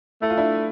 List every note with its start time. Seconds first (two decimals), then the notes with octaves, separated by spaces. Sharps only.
0.22 A3 E4
0.30 F4
0.37 D4 E4